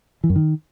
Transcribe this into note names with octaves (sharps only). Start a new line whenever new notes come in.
E3
F#2
D#3